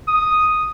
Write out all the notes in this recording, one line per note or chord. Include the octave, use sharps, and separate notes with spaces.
D#6